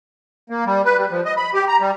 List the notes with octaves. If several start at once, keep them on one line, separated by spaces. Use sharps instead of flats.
A#3
G3
B4
G3
F3
D#5
B5
G4
A#5
G3